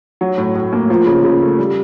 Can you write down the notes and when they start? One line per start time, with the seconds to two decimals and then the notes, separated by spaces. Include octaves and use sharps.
0.21 F#3
0.38 A2
0.55 A2
0.73 A#3
0.90 F3
1.06 C#3
1.24 C#3
1.41 A3
1.59 G3